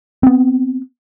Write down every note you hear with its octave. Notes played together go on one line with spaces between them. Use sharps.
B3 C4